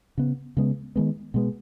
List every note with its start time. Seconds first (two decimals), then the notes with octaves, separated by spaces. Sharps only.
0.18 C#3 B3
0.57 C#3 G#3 B3
0.96 D#3 G#3 B3
1.34 B2 G#3 B3